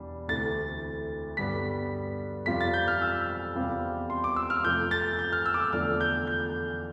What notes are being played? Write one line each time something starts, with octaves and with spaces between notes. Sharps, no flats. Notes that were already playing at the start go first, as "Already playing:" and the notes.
Already playing: E2 B2 G3 D4
D2 C3 E3 A3 A6
G2 D3 G3 B3 B6
F2 C3 G3 C4 F4 B6
A6
G6
F6
E6
E2 C3 G3 C4 F4
C6
D6
E6
F6
F2 C3 F3 A3 G6
A6
G6
F6
E6
D6
E6
E2 D3 F3 A3 D4 F6
G6
G6